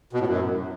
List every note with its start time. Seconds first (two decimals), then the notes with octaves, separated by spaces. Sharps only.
0.13 B2
0.20 A2
0.27 F#2